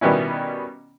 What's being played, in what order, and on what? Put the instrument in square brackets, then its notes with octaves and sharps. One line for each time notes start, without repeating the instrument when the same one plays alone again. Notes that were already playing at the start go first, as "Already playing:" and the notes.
[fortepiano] B2 D#3 G3 B3 C#4 E4